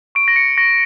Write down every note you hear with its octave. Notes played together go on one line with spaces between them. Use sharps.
C#6 D7
A#6
C#7
C#6 A#6